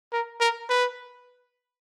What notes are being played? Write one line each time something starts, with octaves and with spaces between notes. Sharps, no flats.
A#4
A#4
B4